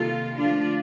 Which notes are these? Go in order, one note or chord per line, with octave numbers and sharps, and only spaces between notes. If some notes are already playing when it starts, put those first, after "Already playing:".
Already playing: C3 D#3 G3 A#3 F4 A4
D3 F3 A3 D4 F4